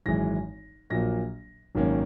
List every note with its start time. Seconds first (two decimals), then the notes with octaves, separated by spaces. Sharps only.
0.06 G#1 F#2 E3 G#3 A#6
0.90 A#1 A#2 F#3 A#3 A#6
1.75 G#1 F#2 D#3 A#3 C#4